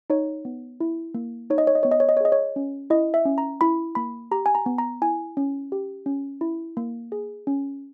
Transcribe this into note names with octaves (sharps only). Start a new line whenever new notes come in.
D#4 C#5
B3
E4
A#3
D#4 C#5
D#5
C#5
D#5
B3 C#5
D#5
C#5
D#5
C#5
G#4 D#5
C#5
C#4
E4 D#5
E5
C#4
A#5
E4 B5
A#3 B5
G4 A#5
G#5
A#5
B3
A#5
E4 G#5
C#4
G4
C#4
E4
A#3
G#4
C#4